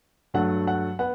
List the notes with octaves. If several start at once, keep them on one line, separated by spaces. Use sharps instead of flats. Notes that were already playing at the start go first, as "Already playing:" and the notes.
G2 F#3 A3 F#5
F#5
B3 F#5